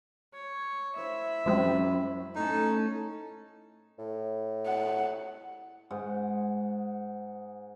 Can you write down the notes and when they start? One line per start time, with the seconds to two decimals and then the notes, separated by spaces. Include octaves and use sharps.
0.34 C#5
0.96 E4 C5 E5 F5 B5
1.46 F#2 F3 G#3 C4
2.36 A2 C#4 D#4 A5
3.99 A2
4.67 F#5
5.91 G#2 F#5